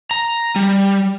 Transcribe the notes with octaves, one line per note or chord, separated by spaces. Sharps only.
A#5
G3